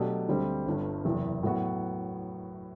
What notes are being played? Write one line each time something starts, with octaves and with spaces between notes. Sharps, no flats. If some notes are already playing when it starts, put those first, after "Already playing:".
Already playing: B2 F#3 A3 D4 G4
D2 D3 G3 C4
G1 G2 D3
F#1 E2 C3
A2 F#3 B3 F#4